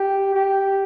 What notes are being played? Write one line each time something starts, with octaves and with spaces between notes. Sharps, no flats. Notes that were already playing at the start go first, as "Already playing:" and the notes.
Already playing: G4
G4